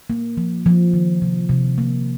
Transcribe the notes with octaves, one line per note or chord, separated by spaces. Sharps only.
A#3
F3
F3
D#3
C3
C3
A#3